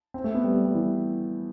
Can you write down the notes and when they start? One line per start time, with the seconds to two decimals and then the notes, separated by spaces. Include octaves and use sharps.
0.14 C4
0.24 A3
0.34 B3
0.44 G3
0.54 G3
0.65 G3
0.75 E3